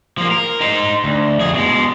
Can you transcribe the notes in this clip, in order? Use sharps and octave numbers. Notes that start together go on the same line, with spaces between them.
F3 A#3
A#4
D#4 C5
D2
F2 G#4
B2 G#3